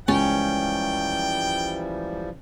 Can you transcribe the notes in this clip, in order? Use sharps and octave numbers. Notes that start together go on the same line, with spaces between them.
C#2 E3 F3 G3 C#4 G5